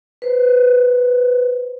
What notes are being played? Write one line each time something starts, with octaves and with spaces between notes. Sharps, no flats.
B4 C5